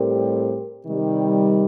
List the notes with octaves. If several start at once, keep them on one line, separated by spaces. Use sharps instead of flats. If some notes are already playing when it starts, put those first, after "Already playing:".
Already playing: A2 G3 C4 G4 A#4
C3 D#3 G3